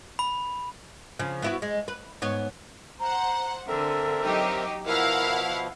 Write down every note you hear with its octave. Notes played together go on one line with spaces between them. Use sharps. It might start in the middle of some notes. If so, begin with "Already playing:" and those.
B5
C#3 F3
B3 E4 F#4
G#3
B4
G#2 B3 C#5
C5 F#5 A#5
D3 C4 A4 A#4 E5
F#3 D#4 G4
B2 F3 E4 A#4 F5 F#5